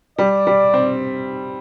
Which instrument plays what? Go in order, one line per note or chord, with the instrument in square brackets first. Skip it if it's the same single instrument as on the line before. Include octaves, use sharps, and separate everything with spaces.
[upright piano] G3 [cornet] D5
[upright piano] G3
C4